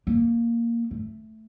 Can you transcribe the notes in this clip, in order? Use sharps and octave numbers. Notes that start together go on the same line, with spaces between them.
A#3
A3